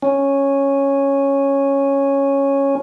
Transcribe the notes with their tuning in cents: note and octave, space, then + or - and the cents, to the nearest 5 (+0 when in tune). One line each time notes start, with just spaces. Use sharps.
C#4 -5